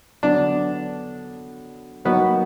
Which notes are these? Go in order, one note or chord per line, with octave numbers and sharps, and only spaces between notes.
D3 F#3 B3 D4
F#3 A#3 B3 D#4 F#4